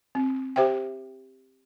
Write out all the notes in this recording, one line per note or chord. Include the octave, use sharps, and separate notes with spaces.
C4
G4 C5 E5 G5